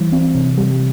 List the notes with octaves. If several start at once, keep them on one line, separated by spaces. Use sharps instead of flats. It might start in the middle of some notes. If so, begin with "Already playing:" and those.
Already playing: E3 G3
C4
C3
G3